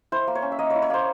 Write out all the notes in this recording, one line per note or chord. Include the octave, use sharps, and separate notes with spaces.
E4 C5
A#3
C#5
C#4
E5
A#3 D#5
E4 C#5
C#5
A#3 C5